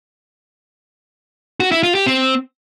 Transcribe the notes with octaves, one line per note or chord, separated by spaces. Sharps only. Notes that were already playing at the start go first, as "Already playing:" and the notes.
F#4
E4
F4
G4
C4